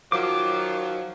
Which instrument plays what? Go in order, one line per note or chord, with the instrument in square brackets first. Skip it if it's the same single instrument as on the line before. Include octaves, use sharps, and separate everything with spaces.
[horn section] D#3 F3 F#3 [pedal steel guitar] D6